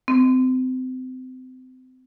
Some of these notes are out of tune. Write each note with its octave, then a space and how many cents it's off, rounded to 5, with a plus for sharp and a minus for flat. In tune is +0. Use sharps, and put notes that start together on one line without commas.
C4 -30